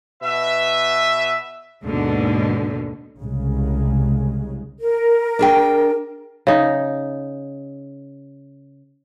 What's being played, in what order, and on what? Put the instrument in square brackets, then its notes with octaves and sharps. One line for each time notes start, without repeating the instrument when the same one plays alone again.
[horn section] B2 B4 E5
[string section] D#2 G#2 B2 D3
[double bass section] C2 C#3 G#3
[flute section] A#4
[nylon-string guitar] D4 G#4 G5
[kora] C#3 D#4